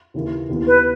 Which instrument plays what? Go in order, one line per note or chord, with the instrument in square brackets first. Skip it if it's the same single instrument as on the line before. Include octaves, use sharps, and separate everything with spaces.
[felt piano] D#2 C#3 E3 A#3
D#2 C#3 E3 B3 E4
[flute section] B4